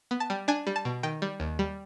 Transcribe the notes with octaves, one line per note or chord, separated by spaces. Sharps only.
B3
A5
G3
D4 G#5
G3
A5
B2
D#3 G5
G3
D#2
G3